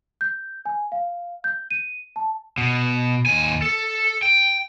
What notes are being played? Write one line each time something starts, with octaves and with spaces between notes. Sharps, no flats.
G6
G#5
F5
G6
D#7
A5
B2
D#2 G#5
A4
G5